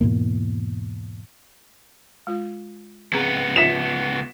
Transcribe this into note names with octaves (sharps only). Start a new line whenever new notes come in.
E2 G#2 B2 A#3
G#3 F4
C#2 B3 C4 G#4 A#5
F4 E5 B6 E7